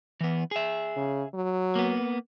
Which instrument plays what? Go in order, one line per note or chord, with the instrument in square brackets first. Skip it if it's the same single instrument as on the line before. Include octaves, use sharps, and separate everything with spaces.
[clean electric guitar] E3 B3
G#4 E5
[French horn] C#3
F#3
[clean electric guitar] A#3 B3